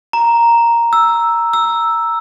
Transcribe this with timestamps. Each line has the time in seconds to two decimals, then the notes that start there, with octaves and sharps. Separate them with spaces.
0.13 A#5
0.93 E6
1.53 E6